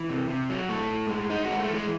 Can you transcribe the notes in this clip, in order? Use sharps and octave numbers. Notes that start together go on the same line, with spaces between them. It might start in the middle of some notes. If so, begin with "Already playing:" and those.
Already playing: E3
C3
C3
F#3
A2 A3
A2
G#3
G#2 D#4
F#4
G#3
A3
E3 G#3